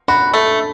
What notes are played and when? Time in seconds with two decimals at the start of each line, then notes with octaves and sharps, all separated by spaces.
0.08 F#4 B5
0.34 A3